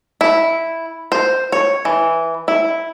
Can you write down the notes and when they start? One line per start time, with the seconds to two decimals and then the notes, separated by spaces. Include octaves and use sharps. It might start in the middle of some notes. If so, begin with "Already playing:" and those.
0.21 E4
1.12 C5
1.52 C#5
1.85 E3
2.48 E4